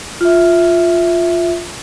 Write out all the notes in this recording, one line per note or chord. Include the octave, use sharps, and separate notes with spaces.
F4 E5